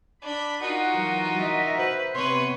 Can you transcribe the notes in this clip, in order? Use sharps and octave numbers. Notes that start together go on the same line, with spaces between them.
D4 B5
D#4 F4 F#4 A#4 F#5
E3 F#3
D#5 E5
B4 C5
C3 B3 B4 C#5 C6